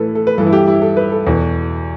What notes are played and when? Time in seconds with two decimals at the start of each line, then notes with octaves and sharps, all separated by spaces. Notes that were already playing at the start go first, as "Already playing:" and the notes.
Already playing: A2 E3 A4 B4
0.15 A4
0.27 B4
0.38 G2 E3 A4
0.47 E4
0.53 G4
0.67 E4
0.82 A4
0.97 B4
1.12 A4
1.27 E2 B2